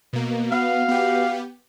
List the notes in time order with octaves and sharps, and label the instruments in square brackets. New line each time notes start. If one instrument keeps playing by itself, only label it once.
[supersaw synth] B2 A#3
[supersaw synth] B3 [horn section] F#4 F5
[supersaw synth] B3 G4